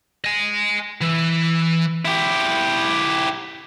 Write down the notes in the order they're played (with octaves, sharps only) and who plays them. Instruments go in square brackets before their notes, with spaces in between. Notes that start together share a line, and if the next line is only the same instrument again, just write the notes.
[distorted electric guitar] D#5 G#5
E3
E4 G4